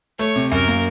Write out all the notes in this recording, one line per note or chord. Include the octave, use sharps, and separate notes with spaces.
A3 C#5
C3
F#2 A#4
A#3